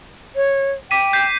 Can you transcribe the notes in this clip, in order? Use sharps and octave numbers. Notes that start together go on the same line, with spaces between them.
C#5
G5 D6 B6 D#7
G6 B6 C7